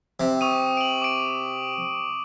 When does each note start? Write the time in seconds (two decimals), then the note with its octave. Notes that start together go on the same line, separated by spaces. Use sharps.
0.20 C3
0.41 C#6 D#6 D#7
0.77 D7 F#7
1.02 D6 D7